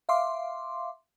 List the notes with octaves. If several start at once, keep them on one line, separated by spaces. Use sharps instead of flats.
E5 F5 C6 D6